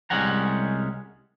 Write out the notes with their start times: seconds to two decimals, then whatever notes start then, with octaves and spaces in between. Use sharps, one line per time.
0.10 C2 G3 G#3 C#4 F#5 A#5